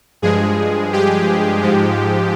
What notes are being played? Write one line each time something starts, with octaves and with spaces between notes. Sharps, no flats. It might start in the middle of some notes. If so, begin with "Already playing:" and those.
G2 F3 G#3 G#4
G4
G#2 F3 G#3